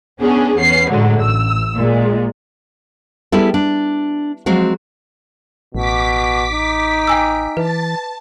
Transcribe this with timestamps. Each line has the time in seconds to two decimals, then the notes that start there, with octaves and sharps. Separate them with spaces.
0.20 B3 C#4 D4 G#4
0.56 E2 B3 C#4 C7
0.89 A2 D3 F#3 G#3
1.19 A1 E6
1.77 A#2 G#3
3.32 G3 B3 E4 G#4 A4
3.54 D4
4.46 F3 F#3 G#3 C4 F#4
5.75 A1 B2 D6 B6
6.52 D#4
7.07 G5 G#5 E6
7.57 E3 B4 A5